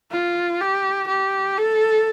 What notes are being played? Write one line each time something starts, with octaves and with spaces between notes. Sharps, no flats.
F4
G4
G4
A4